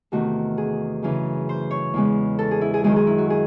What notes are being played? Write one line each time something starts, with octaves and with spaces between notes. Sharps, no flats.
E2 C3 D#3 A3 F#4
G#4
F#2 C#3 E3
C5
C#5
E2 C#3 G#3
A4
G#4
E4
G#4
F#2 D#3 G#3 G#4
G#4
E4
F#4
G#4